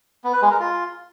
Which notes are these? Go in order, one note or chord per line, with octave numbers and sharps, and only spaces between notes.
B3
B4
G#3
A#4
F4